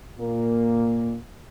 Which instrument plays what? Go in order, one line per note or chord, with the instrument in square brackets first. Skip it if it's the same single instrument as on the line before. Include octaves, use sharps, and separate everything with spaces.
[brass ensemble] A#2 A#3